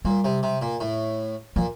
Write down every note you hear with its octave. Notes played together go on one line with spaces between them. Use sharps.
A#2 G3
C3
C3
A#2
A2
A#2 F3